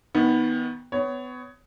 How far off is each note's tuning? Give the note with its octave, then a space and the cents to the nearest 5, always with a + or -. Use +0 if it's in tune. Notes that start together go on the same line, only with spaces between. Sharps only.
D#3 +20 B3 +0
B3 +30 C#5 +10